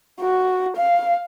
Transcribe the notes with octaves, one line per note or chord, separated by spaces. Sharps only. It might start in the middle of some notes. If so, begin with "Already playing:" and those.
F#4
F5